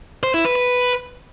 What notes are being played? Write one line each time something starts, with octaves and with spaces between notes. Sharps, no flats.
C5
E4
B4
B4